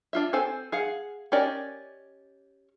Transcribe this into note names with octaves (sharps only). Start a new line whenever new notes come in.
D4 F4 E5
C4 A4 C5 G#5
G#4 F5 F#5
C#4 G4 A#4 D5 D#5